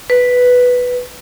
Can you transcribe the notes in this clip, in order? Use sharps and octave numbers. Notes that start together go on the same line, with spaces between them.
B4